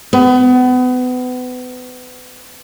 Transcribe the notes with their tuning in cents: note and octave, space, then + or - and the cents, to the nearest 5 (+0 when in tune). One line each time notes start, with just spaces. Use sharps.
B3 +30